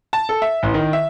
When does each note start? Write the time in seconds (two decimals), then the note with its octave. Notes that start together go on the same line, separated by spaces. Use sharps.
0.13 A5
0.29 A4
0.42 E5
0.63 A1
0.74 D#3
0.93 E5